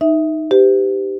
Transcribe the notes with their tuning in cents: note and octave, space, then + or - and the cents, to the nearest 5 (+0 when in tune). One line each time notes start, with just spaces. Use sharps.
D#4 +0 E5 -10
G4 +0 C5 -45